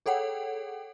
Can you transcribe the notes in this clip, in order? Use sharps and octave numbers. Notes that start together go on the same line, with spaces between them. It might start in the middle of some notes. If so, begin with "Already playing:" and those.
G#4 A4 C#5 F#5 G5